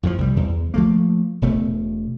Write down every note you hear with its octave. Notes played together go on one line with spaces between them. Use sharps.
F2 A2 D#3 F3
C2 F3 G3
E2
F3 A3 A#3
E1 B2 A3